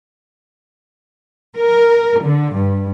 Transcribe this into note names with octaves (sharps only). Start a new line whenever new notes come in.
A#4
D3
G2